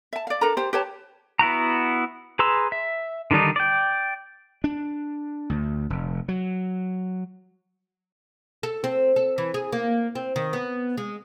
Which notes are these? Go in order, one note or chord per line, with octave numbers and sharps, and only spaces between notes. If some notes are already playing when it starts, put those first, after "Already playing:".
E5 A5
D5 F5
D4 A4 A#4 A#5
G4 C5
G4 B4 C#5 A5
B3 E4 F#4 A#5
G#4 B4 A#5 C6 E6
E5
D3 D#3 G3 D4 D#4
D5 G5
D4
D2
F1
F#3
A4
C4
A4
E3
G#4
A#3
C4
D#3
B3
G#3